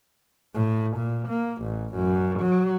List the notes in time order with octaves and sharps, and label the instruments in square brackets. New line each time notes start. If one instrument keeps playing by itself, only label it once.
[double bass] A2
A#2
A#3
A1
F#2
F#3